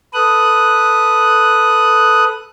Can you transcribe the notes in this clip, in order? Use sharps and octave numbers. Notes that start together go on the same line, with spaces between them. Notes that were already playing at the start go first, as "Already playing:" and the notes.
A4 B4 D#6 F#6